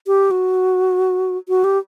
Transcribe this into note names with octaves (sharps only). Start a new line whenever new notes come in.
G4
F#4
F#4
G4